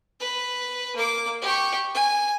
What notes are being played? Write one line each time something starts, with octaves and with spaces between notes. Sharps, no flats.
B4
A#3 D6
G4 C#6
G#5